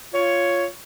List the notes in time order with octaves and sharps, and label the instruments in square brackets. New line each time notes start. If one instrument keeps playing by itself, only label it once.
[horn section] F4 C#5